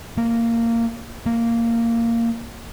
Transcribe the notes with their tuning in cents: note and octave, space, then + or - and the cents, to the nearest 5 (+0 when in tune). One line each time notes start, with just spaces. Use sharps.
A#3 -15
A#3 -10